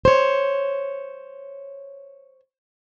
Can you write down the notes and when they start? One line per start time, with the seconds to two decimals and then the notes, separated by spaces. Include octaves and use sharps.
0.05 C5 C#5